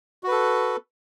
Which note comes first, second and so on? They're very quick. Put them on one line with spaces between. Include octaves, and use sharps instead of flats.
F#4 B4 A4